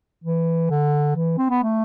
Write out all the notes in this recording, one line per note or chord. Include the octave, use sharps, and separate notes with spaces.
E3
D3
E3
C4
B3
A3